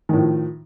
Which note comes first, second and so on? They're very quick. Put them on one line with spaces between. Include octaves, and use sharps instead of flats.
D#3 A2 F3